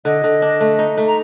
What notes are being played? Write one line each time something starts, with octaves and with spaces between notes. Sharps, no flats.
D3 D#5
D3
D4
A3
D#4
A3
A#5